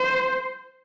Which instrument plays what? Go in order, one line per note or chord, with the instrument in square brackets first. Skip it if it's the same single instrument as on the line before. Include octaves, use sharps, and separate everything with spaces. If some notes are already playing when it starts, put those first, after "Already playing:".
Already playing: [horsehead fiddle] C5